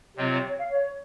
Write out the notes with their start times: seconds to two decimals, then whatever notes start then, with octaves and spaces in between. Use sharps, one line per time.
0.16 C3 F#3 C4 F4 D#5
0.32 C#5
0.47 C#5
0.57 F5
0.67 C#5